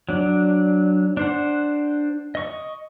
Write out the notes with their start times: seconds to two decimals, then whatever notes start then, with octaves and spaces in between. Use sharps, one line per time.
0.09 F#3 D4
1.17 D4 C5 F#5
2.35 D#5 C#6